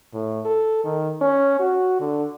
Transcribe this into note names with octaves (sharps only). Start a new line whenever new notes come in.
A2
A4
D#3
C#4
F#4
D3